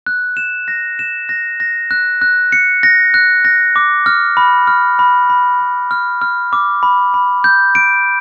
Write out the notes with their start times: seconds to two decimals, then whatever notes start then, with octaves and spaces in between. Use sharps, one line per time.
0.06 F#6
0.37 E7
0.68 A#6
0.99 E7
1.29 A#6
1.60 A#6
1.91 F#6
2.21 F#6
2.52 C#7
2.83 A#6
3.14 F#6
3.45 A#6
3.76 D6
4.06 F6
4.37 B5
4.67 F6
4.99 B5
5.30 B5
5.60 B5
5.91 F6
6.22 F6
6.53 D6
6.83 B5
7.14 B5
7.44 G6
7.75 D7